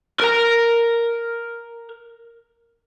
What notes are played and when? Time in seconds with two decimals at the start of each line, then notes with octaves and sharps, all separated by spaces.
0.20 A#4 A#5